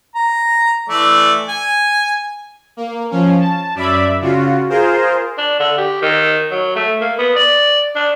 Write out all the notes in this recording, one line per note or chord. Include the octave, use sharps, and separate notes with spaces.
A#5
E3 A3 D5
G#5
A#3
F3 C#4
A5
F#2 D5 E5 B5
C#3 F4 F#4
F4 G#4 A#4 C5
D4
D3
G4
D#3
F#3
A3
A#3
B3
D5
D4